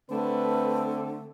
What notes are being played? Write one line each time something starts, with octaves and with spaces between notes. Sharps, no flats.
D3 A3 C4 B4